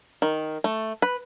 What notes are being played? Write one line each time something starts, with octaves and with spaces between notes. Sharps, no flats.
D#3
A3
B4